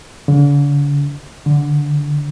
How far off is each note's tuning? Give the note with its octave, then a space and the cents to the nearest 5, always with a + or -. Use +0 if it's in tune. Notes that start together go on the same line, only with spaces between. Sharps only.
D3 -45
D3 -10